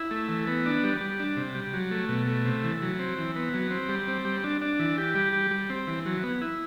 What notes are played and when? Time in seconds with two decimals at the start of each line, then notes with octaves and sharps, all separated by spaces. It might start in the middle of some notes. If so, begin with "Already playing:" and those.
Already playing: E4
0.11 A3
0.29 E3
0.47 B3
0.66 D4
0.84 G3
1.01 G3
1.20 D4
1.37 C3
1.55 G3
1.74 F#3
1.91 A3
2.09 B2
2.27 A3
2.45 C3
2.64 E3
2.82 F#3
2.99 C4
3.18 E3
3.36 B3
3.54 F#3
3.71 C4
3.89 G3
4.08 C4
4.25 G3
4.44 D4
4.61 D4
4.79 E3
4.98 G4
5.15 G3
5.33 G4
5.51 G3
5.70 C4
5.87 E3
6.06 F#3
6.23 B3
6.41 E4